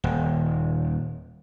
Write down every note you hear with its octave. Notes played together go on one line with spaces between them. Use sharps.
D#1